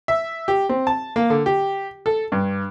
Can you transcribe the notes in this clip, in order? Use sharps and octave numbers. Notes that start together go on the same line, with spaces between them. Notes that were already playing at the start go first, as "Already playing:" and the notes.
E5
G4
C4
A5
A#3
D3
G4
A4
G2